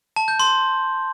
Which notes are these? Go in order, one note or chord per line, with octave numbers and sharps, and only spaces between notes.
A5
G6
C6